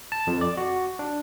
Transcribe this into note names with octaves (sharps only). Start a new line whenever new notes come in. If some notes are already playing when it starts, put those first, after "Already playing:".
A5
F2
D5
F#4
D4